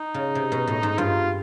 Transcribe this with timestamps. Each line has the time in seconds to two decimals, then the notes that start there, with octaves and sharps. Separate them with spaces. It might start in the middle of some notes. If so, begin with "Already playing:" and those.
Already playing: D#4
0.14 C#3
0.35 C3
0.52 B2
0.67 A2
0.83 G#2
0.98 G2 F4